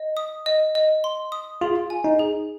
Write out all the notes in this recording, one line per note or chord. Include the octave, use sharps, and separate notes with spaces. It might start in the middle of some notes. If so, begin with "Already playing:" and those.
Already playing: D#5
D#6
D#5
D#5
C6
D#6
F4 G#4
G#5
D#4
G#4